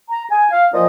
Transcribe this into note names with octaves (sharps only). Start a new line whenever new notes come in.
A#5
G#5
F5
A#2 F3 D#5